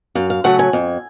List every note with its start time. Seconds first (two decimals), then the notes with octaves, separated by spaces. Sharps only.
0.15 F#2 F5
0.30 F5
0.44 C#3 F#3 A3 C#4 F#5
0.59 G#5
0.73 F2